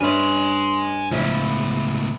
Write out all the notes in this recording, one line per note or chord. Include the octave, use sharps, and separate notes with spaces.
G2 C#4 E5 G#5 C6
C#2 A2 F3 E4 E5